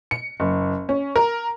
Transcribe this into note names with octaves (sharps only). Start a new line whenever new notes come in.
C#7
F#1
C#4
A#4